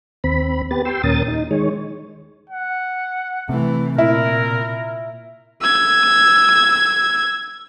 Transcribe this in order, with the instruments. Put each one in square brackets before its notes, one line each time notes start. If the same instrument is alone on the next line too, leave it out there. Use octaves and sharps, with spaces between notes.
[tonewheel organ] D#2 C4 B5
B3 G4 B4 A6
G4 G5 C6 E6
D#2 A#2 C#4 A#4 D#6 A6
D#4
D#3 G#3 C#5
[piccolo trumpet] F#5
[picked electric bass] C3 [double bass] E3 A3
[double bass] A#2 [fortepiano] E4 [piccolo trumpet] A#4
[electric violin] E6 G#6